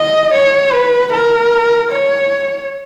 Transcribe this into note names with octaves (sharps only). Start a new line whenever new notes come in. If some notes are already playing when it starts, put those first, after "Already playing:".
Already playing: D#5
C#5
B4
A#4
C#5